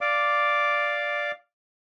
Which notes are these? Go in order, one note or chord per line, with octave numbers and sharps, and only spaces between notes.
D5 F5 D6